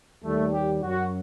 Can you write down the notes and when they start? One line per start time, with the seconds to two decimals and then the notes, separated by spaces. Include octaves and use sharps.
0.24 D#2 D#3 G3 A3
0.54 G4
0.83 F#2 F#3 F#4